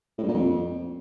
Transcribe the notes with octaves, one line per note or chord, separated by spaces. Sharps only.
A2
G2
A#2
F2